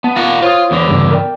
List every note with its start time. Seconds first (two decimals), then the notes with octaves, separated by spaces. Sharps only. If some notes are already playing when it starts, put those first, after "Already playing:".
0.04 B3 A5
0.16 F4 A#4 F#5
0.42 F4 C5 C#5 D#6
0.71 E2 D3
0.88 G2 C#3 G3
1.11 A#4 D5 G5